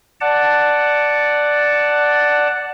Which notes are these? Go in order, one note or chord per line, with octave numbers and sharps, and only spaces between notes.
D5 F#5 A5